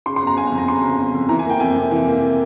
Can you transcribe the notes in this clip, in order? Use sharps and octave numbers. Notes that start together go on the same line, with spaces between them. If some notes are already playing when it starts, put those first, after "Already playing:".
C#3 C6
C6
G1
A#5
G1 G#5
A#5
F2
A#5
C#3 C6
G1
G1
F2
E3 A#5
G#5
A#3 G5
F2 G#5
C3
E3
A#3